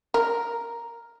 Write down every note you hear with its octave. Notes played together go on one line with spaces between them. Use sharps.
A#4